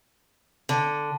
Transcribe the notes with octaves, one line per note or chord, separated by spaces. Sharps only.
D3